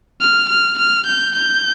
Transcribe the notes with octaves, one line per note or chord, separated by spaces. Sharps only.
F6
F6
F6
G6
G6